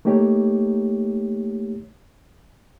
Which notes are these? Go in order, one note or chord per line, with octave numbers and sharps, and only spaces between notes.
A3 A#3 D#4 G4 C#5